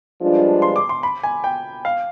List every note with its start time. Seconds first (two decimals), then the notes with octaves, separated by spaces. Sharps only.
0.21 G2 F3 G#3 D4 F4
0.62 C6
0.76 D6
0.89 C6
1.03 B5
1.23 G#5
1.44 G5
1.85 F5